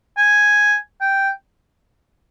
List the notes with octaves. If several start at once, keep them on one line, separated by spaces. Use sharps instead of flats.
G#5
G5